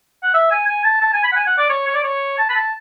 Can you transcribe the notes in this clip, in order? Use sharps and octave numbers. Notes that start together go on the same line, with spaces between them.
F#5
E5
G#5
G#5
A5
A5
G#5
B5
F#5
G#5
F#5
D5
C#5
C#5
D5
C#5
A5
B5
A5